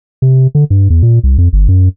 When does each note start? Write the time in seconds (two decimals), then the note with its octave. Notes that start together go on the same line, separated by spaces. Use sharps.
0.22 C3
0.55 D3
0.70 G2
0.90 E2
1.02 A#2
1.23 C2
1.38 F2
1.53 G1
1.68 F#2